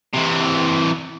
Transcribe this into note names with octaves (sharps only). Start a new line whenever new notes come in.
C3 E3